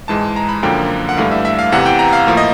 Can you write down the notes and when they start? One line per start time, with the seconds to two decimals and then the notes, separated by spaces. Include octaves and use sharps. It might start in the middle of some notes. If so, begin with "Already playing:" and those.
0.08 G#2 E3 G#3 A5
0.36 A#5
0.49 B5
0.63 F#2 D3 F3 A#3 G5
1.09 F#5
1.17 G2 E3 A3 D4 F5
1.31 E5
1.45 E5
1.59 F5
1.72 E2 C3 E3 F#5
1.86 G5
1.99 A#5
2.13 F5
2.27 A2 F3 A#3
2.37 D#5